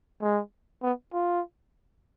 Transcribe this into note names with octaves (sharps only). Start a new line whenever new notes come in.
G#3
B3
F4